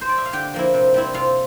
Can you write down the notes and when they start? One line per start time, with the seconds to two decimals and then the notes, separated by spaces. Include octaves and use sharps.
0.01 C5
0.09 D5
0.18 E5
0.25 F5
0.33 D3 G4 G5
0.54 F3 A#3 E4
0.74 C3
0.94 G3 C4 E4
1.14 C3 F4 F5